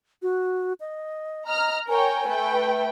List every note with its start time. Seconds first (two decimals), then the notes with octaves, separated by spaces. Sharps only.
0.22 F#4
0.80 D#5
1.47 D#5 A#5 F6
1.88 A#4 C#5 G5 G#5
2.28 A3 B4 G5